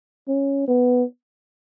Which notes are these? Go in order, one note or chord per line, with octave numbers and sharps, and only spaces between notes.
C#4
B3